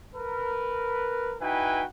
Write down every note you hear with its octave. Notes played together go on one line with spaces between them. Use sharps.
A#4 B4
D#4 E4 F#4 B4 G5 G#5